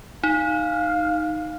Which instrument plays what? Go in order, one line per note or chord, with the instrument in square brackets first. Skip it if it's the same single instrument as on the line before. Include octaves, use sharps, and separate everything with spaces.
[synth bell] D#4 [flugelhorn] F5